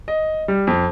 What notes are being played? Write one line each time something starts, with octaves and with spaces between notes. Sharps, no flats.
D#5
G3
F2